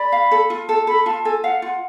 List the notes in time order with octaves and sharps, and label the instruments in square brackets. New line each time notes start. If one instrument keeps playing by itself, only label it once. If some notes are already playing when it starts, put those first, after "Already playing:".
Already playing: [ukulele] D5 [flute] B5
[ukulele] F5
A4
F4
[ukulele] A4 [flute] A5
[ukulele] A4 [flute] B5
[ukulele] F4 [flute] A5
[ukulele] A4 [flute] G#5
[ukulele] F5 [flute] F#5
[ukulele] F4 [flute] F#5